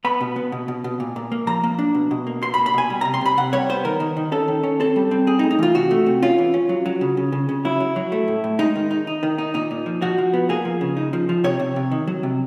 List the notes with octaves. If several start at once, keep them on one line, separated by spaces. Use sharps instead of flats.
B3 B5
B2
B3
B2
B2
B2
A#2
A#2
A#3
F3 A#5
A#3
D4
B2
B2
A#3
B2 C6
B5
A#3
B5
B2 G#5
G3
C3 A#5
C6
C3 B5
C3 F#5
G3 C#5
B3 C5
D#3 A#4
D#3
D#3
C#4 A4
D#3
C#4
C4 A4
G3
C4
C4 G#4
D#4
A2
D#4
E3 F4
C3 F#4
A3
C3
C#4 F4
E3
C#4
F#3
F#3
C#3
C#3
C#3
C#3
F#3 E4
F#3
F#3
A3
A2
A2
G#3 D#4
D#3
D#4
D#4
D#3
D#4
A#2 D#4
A#2
F3
F3 F#4
F3
B3
A#3 G#4
F3
C#3
D#4
F3
F3
C3 C#5
C3
C3
D#3
F#3
C3